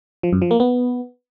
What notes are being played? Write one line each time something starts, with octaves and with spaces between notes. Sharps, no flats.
F3
F#2
F3
A#3
B3